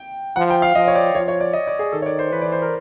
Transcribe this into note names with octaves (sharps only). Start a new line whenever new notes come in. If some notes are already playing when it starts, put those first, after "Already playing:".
Already playing: G5
F3 F#5
G5
F5
F3 D#5
C#5
D5
F3 C#5
C#5
D5
D#5
D5
G#4
D#3 A4
C#5
D5
C5
E3 B4
D5
C5
A#4